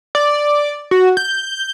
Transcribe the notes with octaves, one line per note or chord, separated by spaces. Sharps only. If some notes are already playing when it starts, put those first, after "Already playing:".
D5
F#4
G6